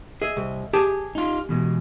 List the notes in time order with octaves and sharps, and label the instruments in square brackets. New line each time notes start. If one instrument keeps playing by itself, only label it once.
[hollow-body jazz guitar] G#4 [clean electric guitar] D#5 E5
[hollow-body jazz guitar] C2
G4 G#4 A5
[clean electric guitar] D#4 F4
E2 B2 G#3